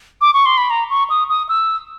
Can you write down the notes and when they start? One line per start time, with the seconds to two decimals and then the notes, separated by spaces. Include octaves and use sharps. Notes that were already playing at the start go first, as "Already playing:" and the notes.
0.21 D6
0.34 C#6
0.46 C6
0.58 B5
0.70 A#5
0.90 C#6
1.10 D#6
1.29 D#6
1.49 E6